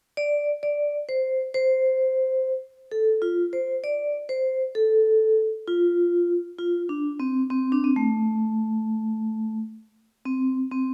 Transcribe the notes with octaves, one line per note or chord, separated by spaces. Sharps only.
D5
D5
C5
C5
A4
F4
C5
D5
C5
A4
F4
F4
D4
C4
C4
D4
C4
A3
C4
C4